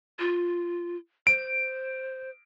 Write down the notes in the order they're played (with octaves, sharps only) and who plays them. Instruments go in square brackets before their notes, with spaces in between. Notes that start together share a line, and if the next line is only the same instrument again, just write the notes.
[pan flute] F4
[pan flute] C5 [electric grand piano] D7